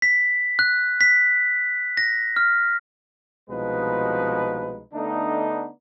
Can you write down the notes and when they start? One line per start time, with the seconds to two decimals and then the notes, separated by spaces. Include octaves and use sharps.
0.02 B6
0.59 F#6
1.01 B6
1.97 A#6
2.36 F6
3.50 C2 B2 F3 G#3 D#4 B4
4.94 D3 A3 B3 D4 D#4